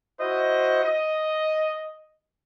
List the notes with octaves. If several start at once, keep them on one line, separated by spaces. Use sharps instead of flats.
E4 F#4 C5 D#5
D#5